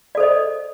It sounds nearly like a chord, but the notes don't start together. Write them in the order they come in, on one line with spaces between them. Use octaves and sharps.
D5 A4 C5 D#5